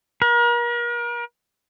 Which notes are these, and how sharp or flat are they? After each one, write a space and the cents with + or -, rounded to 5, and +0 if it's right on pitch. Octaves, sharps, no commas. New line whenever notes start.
A#4 +40